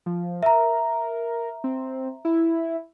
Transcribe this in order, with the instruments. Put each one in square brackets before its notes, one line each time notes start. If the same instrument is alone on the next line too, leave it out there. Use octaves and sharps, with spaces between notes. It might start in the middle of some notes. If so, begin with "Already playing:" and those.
[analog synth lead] F3
[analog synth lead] A#4 [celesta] E5 A#5
[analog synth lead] C4
E4